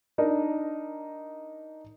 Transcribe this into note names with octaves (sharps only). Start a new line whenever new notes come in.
D4 D#4 A#4